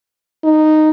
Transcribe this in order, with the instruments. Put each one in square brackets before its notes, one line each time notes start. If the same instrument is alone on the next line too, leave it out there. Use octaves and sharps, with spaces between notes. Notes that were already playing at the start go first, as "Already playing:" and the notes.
[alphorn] D#4